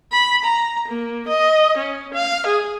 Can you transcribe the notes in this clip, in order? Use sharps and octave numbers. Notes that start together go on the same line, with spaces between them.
B5
A#5
A#3
D#5
C#4
F5
G#4